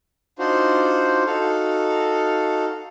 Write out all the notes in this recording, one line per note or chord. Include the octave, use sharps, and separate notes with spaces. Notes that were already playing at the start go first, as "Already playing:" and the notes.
D4 D#4 F4 F#4 C5
D#4 F#4 A4 F5